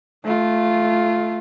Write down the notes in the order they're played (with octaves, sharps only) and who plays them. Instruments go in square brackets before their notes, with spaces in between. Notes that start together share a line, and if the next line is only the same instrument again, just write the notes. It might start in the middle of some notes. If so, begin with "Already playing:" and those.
[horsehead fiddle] A3 F4